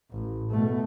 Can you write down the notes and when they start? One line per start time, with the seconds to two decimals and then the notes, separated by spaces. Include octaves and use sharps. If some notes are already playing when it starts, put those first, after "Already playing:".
0.12 A1
0.51 B2 A3